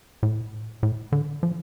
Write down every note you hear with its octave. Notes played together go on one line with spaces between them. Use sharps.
A2
A2
D3
F3